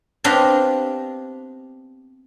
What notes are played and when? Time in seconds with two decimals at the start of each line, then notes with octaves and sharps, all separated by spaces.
0.24 B3 C4 D4 G4 D#5 F5